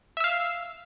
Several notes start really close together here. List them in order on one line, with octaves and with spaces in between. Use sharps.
E5 E6 F5